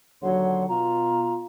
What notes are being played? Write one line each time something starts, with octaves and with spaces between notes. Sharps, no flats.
D#2 D3 F#3 C#5 F#5 C6
B2 F4 A#5